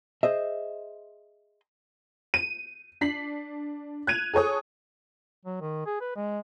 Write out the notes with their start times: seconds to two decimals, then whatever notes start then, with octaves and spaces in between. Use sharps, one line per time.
0.23 G#4 C5 D#5 E5
2.34 D#7
3.01 D4 B6 C7 F#7
4.07 F#6 G#6 D#7 F7
4.33 G#4 A4 C#5 D#6
5.45 F#3
5.61 D#3
5.86 G#4
6.01 B4
6.16 G#3